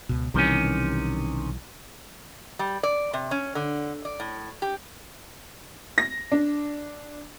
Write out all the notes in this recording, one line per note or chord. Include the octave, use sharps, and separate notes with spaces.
C#2 B2
B1 C3 D#3 E3 G3 C#4
G3
D5
C3
C#4
D3
D5
A2
G4
A#6
D4